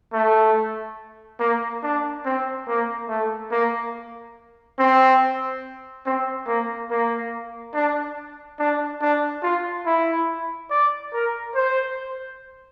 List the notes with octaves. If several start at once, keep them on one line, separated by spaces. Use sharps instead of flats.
A3
A#3
D4
C4
A#3
A3
A#3
C4
C4
A#3
A#3
D4
D4
D4
F4
E4
D5
A#4
C5